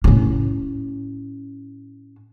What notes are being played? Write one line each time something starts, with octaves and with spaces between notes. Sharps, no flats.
A2 C#4